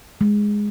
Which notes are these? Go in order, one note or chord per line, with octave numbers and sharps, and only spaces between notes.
G#3